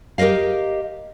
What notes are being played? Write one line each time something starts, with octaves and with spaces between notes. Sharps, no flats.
G4 A#4 C#5 D#5 F5